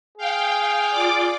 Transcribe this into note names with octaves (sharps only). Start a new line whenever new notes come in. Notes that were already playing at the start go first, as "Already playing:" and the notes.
G#4 F5 G5
F4 D5 D6